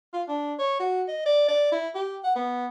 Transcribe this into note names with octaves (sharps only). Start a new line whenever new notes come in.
F4
D4
C#5
F#4
D#5
D5
D5
E4
G4
F#5
B3